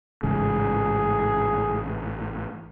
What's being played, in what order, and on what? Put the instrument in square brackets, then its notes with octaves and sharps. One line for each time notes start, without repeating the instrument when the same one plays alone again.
[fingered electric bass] A1 G#2 C#3 [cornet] G#4